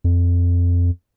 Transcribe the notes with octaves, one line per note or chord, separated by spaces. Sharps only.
F2